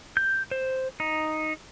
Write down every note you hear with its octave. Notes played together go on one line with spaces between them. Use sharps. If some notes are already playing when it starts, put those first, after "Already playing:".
G6
C5
D#4